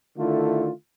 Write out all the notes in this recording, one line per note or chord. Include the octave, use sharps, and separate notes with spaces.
D3 D#3 A3 E4 F4